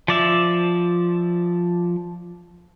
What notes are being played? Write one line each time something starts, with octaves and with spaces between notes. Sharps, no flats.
F3 D5 E5